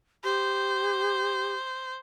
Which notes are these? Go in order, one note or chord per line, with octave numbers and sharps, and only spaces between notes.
G4 C5